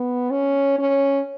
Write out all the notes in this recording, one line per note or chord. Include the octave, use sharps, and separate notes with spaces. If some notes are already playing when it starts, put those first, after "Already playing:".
Already playing: B3
C#4
C#4